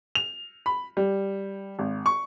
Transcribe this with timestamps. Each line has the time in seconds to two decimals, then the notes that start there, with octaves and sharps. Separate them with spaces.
0.15 F7
0.66 B5
0.97 G3
1.79 G#1
2.06 C#6